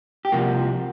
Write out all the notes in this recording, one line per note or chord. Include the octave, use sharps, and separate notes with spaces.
G4
C2 C3 F3 A#3 F#4